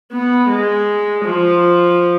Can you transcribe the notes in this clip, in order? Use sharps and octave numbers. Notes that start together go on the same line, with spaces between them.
B3
G#3
F3